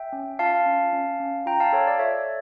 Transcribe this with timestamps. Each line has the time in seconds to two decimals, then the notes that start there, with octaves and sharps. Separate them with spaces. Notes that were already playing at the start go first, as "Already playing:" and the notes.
Already playing: E5 G5
0.13 C#4
0.39 F4 F5 A5
0.66 C#4
0.93 C#4
1.20 C#4
1.46 F4 G5 A#5
1.60 F5 A5
1.73 A4 C#5
1.87 D5
1.99 A4 C#5 E5